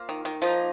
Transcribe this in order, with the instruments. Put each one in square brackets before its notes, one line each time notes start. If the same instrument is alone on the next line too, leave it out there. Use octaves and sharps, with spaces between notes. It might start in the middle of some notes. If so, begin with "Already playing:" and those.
Already playing: [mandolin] A#3 F4 C5
[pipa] D#3
D#3
[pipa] F3 [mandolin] A#3 D#4 A#4 D#5